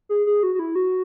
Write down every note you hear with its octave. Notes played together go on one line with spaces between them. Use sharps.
G#4
G#4
F#4
F#4
E4
F#4